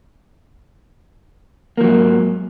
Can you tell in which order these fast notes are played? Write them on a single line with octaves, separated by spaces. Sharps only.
A#3 F3 F#3 G#2